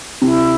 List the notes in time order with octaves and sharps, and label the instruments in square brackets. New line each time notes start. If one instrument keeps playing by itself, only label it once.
[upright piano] C3 [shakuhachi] E4